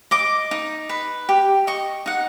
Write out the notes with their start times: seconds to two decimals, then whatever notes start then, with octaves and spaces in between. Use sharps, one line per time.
0.11 D#5 D6
0.51 D#4
0.89 B4
1.29 G4
1.67 D#5 C#6
2.06 D#4 F#5